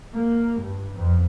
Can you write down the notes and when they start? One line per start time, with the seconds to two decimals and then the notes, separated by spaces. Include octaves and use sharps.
0.13 A#3
0.61 G2
0.96 F2